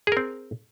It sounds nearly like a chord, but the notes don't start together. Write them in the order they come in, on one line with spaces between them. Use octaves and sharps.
G#4 A#4 C4